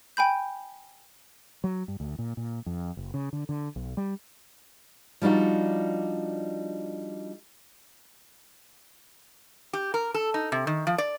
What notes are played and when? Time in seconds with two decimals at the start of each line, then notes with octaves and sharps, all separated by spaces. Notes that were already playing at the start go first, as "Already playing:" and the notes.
0.17 G5 G#5 B5 G6
1.64 F#3
1.88 G2
2.00 D2
2.19 A#2
2.37 A#2
2.66 F2
2.97 F#1
3.14 C#3
3.33 D3
3.49 D3
3.76 B1
3.97 G3
5.22 F3 G3 D4 D#4 F#4
9.73 G4
9.94 A#4
10.14 A4
10.34 D#4
10.52 C3
10.67 D#3
10.87 F3
10.98 D5